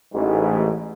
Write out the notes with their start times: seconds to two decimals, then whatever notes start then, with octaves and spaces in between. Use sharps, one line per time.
0.14 A1 G#2